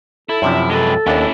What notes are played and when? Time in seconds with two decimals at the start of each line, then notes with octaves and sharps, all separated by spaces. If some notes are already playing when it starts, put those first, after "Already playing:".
0.29 E4 A4
0.42 F#2 C3 F3 D4
0.56 F4
0.70 G#3 A4 B4
1.07 D#2 C#4 D4 E4